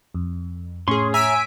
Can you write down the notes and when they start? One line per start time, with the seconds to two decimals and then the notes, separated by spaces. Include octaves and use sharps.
0.15 F2
0.88 A2 C#4 G#4 C6 C#6
1.14 C#5 E5 G#5 A#5 E6 B6 D7